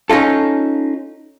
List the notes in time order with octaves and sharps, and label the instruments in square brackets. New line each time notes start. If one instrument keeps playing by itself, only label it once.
[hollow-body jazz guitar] C#4 D#4 F4 A4